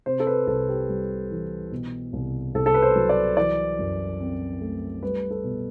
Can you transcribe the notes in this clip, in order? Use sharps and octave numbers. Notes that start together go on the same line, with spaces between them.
C3 C5
A4
B4
C2 A4
G4
G3
E3
B2
C2
C2 A4
A4
B4
C5
F#3
D5
E3 D5
F#2
C4
A3
G3 B4
A4
B2